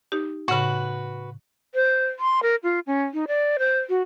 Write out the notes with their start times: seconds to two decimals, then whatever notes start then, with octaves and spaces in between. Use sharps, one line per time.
0.12 D#4 G4
0.48 A2 C#3 F#4 B4
1.75 C5
2.19 C6
2.43 A#4
2.64 F4
2.87 C#4
3.14 D#4
3.28 D5
3.59 C5
3.89 F#4